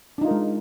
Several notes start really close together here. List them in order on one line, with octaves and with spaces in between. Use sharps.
D4 D#4 F4 A#4 G#3